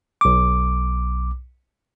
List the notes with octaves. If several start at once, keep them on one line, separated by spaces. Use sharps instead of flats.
B1 D6